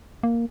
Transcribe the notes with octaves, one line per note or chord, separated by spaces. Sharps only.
A#3